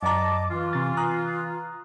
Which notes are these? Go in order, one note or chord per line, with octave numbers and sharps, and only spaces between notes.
F#2 D#5 A5 A#5 D6
E3 F4
C3 A6
A#5 D#6 F#6